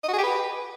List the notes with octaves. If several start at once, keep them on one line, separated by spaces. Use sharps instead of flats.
D#5
F#4
G#4
G4
B4